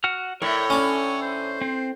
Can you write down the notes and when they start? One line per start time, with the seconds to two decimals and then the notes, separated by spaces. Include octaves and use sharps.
0.04 F#4 F#5 F6
0.42 A2 A#4 C#5 D5 E5
0.70 C#4 D4 A4 G#5 F6
1.22 C5
1.61 C4